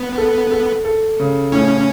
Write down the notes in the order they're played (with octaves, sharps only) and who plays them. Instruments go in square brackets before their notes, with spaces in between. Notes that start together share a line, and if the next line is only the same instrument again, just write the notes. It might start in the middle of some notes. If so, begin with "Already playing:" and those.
Already playing: [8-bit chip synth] B3
[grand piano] A4
A4
A4
C#3
[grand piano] A2 [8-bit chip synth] C#4